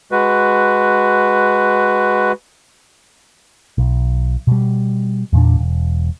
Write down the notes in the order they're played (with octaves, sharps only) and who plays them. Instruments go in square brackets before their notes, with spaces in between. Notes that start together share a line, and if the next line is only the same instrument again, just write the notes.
[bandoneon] G#3 F#4 B4
[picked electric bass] B1
B2 G3
E2 A#2 D4
E1